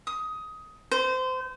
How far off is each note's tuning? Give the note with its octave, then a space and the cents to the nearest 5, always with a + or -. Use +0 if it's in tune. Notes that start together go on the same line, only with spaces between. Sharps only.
D#6 +15
C5 -25